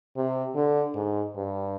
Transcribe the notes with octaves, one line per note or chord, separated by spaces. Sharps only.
C3
D3
G#2
G2